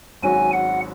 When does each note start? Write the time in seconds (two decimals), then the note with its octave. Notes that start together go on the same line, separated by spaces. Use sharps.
0.22 G#1 G#2 F#3 C#4 F#4 G#5
0.53 F#5